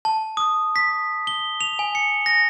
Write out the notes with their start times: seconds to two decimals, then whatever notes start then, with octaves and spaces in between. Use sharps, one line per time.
0.05 A5
0.37 D#6
0.76 B6
1.27 G7
1.61 F7
1.79 G#5
1.95 C#7
2.26 A#6